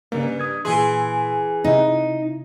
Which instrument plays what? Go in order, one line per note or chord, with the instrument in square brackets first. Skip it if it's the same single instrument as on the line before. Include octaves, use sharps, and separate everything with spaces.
[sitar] G2 [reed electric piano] C#3 A#3
[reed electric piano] D#6 G#6
[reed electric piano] A#2 C6 [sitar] E3 G#4
[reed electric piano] C3 E4 [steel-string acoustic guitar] D#4